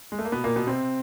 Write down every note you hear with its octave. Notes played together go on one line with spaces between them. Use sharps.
G#3
A3
A#3
B2 B3
A#2 A#3
B2 B3
C3 C4